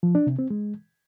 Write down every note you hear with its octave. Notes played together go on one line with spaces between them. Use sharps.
F3
D4
C3
C4
G#3